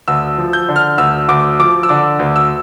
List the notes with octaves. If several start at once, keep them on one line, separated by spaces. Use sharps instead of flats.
D2 E6
F3
G6
D3
F6
D2 E6
D2 D6
F3 D6
E6
D3 D6
D2
E6